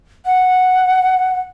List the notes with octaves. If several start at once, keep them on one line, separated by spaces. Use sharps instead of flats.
F#5